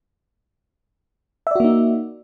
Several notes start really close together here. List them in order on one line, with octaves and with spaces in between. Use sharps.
E5 D5 F#4 A#3 D#4